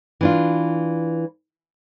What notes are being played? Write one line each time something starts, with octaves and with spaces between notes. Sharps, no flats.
E3 D4 F4